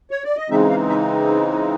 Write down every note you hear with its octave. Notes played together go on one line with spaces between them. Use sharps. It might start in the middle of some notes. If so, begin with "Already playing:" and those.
C#5
D5
D#5
C#3 E3 G#3 C4 D#4 E5
F5
E5